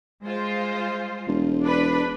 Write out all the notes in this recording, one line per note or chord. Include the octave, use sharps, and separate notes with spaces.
G#3 F4 C5
E1
D4 B4 B5